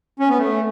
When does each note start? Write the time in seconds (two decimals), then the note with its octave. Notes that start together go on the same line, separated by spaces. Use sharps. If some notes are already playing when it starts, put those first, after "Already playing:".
0.19 C#4
0.29 B3
0.38 A3